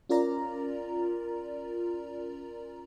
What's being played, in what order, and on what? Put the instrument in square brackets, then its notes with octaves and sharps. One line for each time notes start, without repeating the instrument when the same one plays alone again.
[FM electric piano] C#4 F4 A#4 D5 A#5